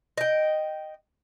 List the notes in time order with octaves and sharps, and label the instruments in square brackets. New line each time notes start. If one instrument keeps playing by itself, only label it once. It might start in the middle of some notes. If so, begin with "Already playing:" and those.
[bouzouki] D#5 G5